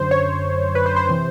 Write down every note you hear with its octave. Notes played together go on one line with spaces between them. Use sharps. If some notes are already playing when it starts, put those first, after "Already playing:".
Already playing: F#2 D3 C5
C#5
B4
C5
C5
C3 E3 C5